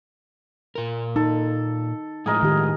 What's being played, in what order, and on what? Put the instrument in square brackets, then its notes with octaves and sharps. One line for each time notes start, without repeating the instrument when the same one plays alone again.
[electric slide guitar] A#2 A#4
[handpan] D#4 [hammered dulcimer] A4
[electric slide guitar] A2 F3 G#3 [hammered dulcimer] G#4 A#4 D#5
[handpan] D#3 G4